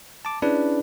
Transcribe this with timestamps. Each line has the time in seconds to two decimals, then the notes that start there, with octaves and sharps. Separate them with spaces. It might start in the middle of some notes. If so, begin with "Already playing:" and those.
0.25 A5 D6
0.42 C#4 D4 E4 G#4 B4 D5